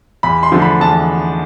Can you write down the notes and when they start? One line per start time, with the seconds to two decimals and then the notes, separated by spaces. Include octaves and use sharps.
0.23 E2 B5
0.43 C6
0.52 D3 F3 A3
0.62 B5
0.80 E2 A5